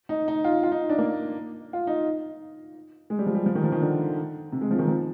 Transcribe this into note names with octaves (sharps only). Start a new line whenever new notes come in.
D#4
D#4
F4
F4
D#4
D4
A#3
F4
D#4
G#3
G3
F3
G3
F3
D#3
F3
D#3
D3
C3
G#3
F3
D#3
F3